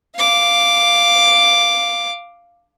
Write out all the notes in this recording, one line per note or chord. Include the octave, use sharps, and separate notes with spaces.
F5 D6